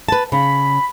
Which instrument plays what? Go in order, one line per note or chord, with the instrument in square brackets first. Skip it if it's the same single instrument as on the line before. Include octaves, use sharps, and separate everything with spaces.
[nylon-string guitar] B4 A5
[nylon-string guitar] C#3 [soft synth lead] B5